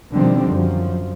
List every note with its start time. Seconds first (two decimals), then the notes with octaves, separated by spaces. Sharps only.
0.13 B2 D3 D#3 F3 G3 C4
0.48 F#2 F3